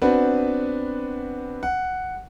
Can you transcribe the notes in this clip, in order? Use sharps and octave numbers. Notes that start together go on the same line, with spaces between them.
B3 C4 D4 F#4 B4
F#5